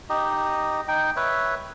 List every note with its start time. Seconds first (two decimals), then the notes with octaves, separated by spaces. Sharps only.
0.10 D#4 G4 D#5
0.88 D#4 G5
1.16 B4 C#5 E5